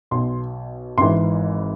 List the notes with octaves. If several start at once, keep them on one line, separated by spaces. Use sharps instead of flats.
B1 B2 C6
G#1 G#2 E3 C6